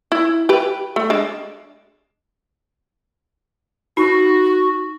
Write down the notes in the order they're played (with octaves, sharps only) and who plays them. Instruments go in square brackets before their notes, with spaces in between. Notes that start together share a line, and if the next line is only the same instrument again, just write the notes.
[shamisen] E4
G4 B4
A3
G#3 D4
[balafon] D#4 [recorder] F#4